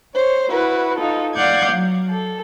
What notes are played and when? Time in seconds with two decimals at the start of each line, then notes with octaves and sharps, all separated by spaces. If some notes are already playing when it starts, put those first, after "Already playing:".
0.15 C5 C#5
0.50 E4 F#4 B4
0.98 D#4 F4 A4
1.34 D5 F5 F#5 D6 G6 G#6
1.70 F#3
2.10 A4